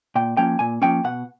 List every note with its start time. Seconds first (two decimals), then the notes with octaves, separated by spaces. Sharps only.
0.15 A#2 G5
0.37 F3 A#3 C#4 G5
0.59 A#2 G#5
0.82 F3 A#3 C#4 G5
1.04 B2 F#5